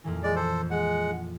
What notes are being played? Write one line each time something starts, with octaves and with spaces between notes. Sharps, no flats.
F2 A#2 E3
G#3 D5
A4 C5
G#3 F#5